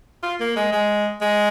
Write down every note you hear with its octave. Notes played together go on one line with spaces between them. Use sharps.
F4
A#3
G#3
G#3
G#3